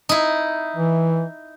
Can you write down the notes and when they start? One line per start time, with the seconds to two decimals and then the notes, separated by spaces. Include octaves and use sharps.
0.09 D#4 E4
0.76 E3